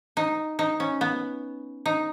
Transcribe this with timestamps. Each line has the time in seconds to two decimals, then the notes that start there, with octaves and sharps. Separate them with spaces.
0.17 D#4
0.59 D#4
0.80 C#4
1.01 B3
1.86 D#4